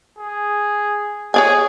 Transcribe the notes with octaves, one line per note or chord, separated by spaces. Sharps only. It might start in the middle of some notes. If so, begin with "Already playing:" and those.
G#4
G#4 C#5 D5 G#5